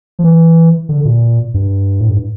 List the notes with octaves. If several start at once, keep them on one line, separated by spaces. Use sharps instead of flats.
F3
E3
D3
A#2
G2
A2
G2